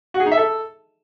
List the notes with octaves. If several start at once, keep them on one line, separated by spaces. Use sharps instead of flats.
F#4
G#4
D#4
E5
A4